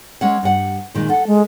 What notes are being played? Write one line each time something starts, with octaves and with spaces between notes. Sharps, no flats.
G#3 C#4 F#5
G2 F#5
A#2 D#3 G#3
A4 F#5
G#3